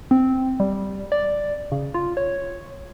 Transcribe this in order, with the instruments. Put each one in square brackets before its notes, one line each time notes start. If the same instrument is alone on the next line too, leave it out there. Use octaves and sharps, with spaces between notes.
[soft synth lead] C4
G3
D5
C#3
F4
C#5